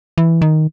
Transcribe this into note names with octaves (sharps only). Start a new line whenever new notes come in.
E3
D#3